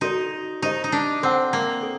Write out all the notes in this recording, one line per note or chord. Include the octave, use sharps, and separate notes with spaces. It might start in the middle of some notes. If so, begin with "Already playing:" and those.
D#4 F#4 A4 D5
D#4 G4 C5 D#5
D#4
D4
C4 A4 C5 F#5 A5
A#3
A4